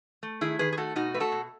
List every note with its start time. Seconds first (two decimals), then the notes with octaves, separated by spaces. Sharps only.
0.23 A3
0.41 D#3 E4 G#4
0.59 D#3 G#4 B4
0.73 G#4
0.77 A3 F#4 A4
0.96 B2 D#4 F#4
1.14 A3 B4
1.20 F#4 A4
1.32 B2